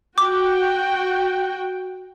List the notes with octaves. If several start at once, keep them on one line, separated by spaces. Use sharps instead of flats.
F#4 G5 D6